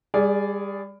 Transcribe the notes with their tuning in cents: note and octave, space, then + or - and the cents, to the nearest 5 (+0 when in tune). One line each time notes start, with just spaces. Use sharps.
G3 +30 G#4 +0 D5 -10